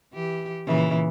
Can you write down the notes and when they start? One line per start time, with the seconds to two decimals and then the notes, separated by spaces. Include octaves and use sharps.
0.13 E3 G4
0.67 A#2 C#3 E3